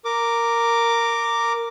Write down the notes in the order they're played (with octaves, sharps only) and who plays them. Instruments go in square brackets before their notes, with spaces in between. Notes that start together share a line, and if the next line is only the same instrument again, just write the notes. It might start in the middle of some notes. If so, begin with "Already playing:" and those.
[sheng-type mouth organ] A#4 D6